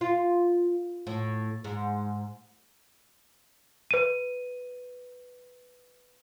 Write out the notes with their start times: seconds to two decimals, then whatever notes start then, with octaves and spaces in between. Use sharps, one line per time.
0.01 F4
1.07 A2
1.64 G#2
3.91 B4 D#7